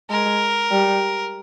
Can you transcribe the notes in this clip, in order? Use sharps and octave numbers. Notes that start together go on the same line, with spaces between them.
G#3 A#4
G3